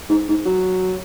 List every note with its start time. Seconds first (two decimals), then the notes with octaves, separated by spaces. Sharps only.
0.09 G#2
0.28 G#2
0.45 F#3